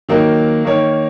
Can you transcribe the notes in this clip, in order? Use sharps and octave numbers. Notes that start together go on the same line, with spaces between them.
D#3 F#3 A#3 D#4 A#4
D#3 A#3 D#4 A#4 C#5